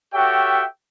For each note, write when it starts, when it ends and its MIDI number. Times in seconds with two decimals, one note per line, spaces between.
0.14 0.63 66
0.14 0.63 67
0.14 0.63 69
0.14 0.63 73
0.14 0.63 76
0.14 0.63 79